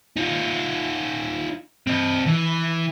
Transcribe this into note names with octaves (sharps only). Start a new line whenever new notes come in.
D#4 F4
C4 D#5
E3